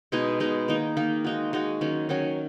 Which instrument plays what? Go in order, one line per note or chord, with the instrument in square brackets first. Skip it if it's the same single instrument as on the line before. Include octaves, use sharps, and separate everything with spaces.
[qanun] B2 G#3 D#4 G#4
B2 G#3 D#4 G#4
D#3 A#3 D#4
D#3 A#3 D#4
G#3 D#4 F#4
G#3 D#4 F#4
D#3 F#3 C#4
D#3 F#3 C#4